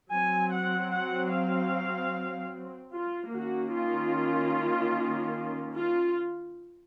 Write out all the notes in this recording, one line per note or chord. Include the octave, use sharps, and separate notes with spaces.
F#3 C4 G#5
F#5
F#5
F5
F4
D#3 A#3 C#4 F#4
F4
F4